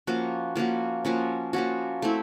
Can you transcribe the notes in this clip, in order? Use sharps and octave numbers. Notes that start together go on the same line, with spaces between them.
F3 A#3 C#4 F#4
F3 A#3 C#4 F#4
F3 A#3 C#4 F#4
F3 A#3 C#4 F#4
A3 C4 E4